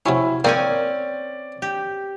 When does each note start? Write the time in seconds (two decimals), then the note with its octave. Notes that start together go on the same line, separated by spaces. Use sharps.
0.06 C3 F#3 C#4 E4
0.44 D#3 A#3 C4 C#4 D5 G#5
1.62 G4